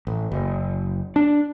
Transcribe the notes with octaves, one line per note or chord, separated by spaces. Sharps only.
A1
F#1
D4